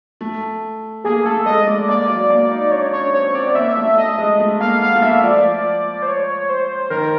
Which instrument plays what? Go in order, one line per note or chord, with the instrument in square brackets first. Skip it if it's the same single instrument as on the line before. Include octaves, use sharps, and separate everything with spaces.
[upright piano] A3
[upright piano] A#3 [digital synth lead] G#4
[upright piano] A3 [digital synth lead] A4
[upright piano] G#3 [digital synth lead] D#5
[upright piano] A3 [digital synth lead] D5
[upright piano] A#3 [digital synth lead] D5
[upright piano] F#3
A#3
D#4
[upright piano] D4 [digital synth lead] C#5
[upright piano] C#4 [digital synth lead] C#5
[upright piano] C4 [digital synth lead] C#5
[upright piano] C4 [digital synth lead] D5
[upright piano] B3
[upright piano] A#3 [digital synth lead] E5
[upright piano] A3
[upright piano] A3 [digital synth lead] D#5
[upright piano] G#3
A3
[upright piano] A#3 [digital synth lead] F5
[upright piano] B3 [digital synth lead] F5
[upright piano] A3
[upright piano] A#3 [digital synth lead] E5
[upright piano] F3 [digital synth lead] D5
[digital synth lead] C5
C#5
C5
[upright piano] D#3 [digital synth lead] A#4